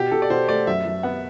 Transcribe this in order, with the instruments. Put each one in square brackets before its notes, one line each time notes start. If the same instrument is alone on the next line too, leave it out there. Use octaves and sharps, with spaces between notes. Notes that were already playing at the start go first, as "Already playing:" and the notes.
Already playing: [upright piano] B2 [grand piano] G4
[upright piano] B2 [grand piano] A4
[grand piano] D5
[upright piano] B2 [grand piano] C5
[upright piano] A3 [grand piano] D5
[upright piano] F#2 [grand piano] E5
[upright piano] F#2
[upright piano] B3 [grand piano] F#5